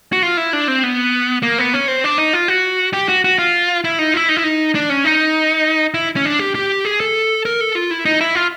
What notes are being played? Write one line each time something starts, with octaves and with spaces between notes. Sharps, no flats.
F#4
F4
E4
D4
C4
B3
A#3
B3
C#4
C4
D4
D#4
F4
F#4
G4
F#4
F#4
F4
E4
D#4
E4
D#4
E4
D#4
D4
C#4
D#4
E4
C#4
D4
G4
G4
G#4
A4
A#4
A4
F4
E4
D#4
E4
F4